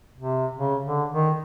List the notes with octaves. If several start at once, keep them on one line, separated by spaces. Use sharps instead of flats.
C3
C#3
D3
D#3